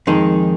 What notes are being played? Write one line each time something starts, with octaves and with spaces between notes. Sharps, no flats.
F2 D#3 G#3 D#4